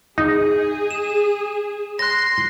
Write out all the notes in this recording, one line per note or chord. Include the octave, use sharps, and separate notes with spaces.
D#4 G#4
E7
C6 F#6 A#6